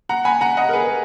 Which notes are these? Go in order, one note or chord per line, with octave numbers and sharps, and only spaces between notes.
F#5 A#5
G#5 B5
F#5 A#5
D#5 F#5
A#4
G#4 B4